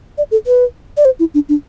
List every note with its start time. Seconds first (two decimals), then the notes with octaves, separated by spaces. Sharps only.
0.18 D5
0.31 A4
0.47 B4
0.97 D5
1.05 C5
1.20 E4
1.34 D4
1.49 D4